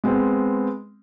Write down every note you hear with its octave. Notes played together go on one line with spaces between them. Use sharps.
G#3 B3 C4